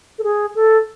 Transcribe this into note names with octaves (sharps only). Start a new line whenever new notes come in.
A4
G#4
A4